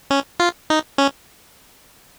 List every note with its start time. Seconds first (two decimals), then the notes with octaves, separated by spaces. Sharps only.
0.11 C#4
0.40 F4
0.70 D#4
0.98 C#4